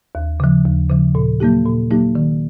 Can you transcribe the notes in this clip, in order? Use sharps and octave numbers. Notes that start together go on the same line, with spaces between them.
D#2
C#3 F3
D#2
C#3 F3
A#2
F#3 A#3 D#4 G4
A#2
F#3 A#3 D#4 G4
D#3